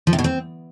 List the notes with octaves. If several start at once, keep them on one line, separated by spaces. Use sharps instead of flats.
F3
C3
B2
C4